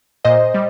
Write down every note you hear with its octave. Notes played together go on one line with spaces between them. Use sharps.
A#2 C5 D#5
G3